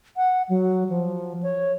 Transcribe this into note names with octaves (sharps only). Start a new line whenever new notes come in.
F#5
F#3
F3
C#5